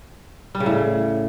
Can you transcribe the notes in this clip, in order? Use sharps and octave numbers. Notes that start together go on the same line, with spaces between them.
G3
C#3
A2